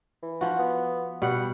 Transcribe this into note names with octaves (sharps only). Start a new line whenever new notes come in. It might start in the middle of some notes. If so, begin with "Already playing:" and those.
E3
F3 F#4
B3
B2 G3 F#5